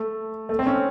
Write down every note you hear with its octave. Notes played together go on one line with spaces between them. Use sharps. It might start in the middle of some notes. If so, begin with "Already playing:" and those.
Already playing: A3
A3
C4
C#4